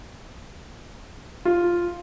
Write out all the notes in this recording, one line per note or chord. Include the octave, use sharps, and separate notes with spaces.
F4